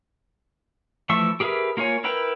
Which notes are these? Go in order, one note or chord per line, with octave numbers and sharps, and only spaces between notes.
E3 F3 A3 E5 C#6
G4 G#4 A#4 B4 E5
A#3 F4 A#4 C#5 G#5
E4 A#4 B4 G5